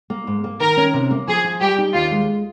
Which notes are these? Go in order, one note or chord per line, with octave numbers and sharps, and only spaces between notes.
A#3
G#2
A#3
D#3 A#4
C#4
C3
A#3
F3 G#4
F4
G3 G4
D#4
D#2 F4
G#3